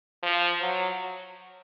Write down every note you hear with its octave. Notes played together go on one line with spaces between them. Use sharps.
F3
F#3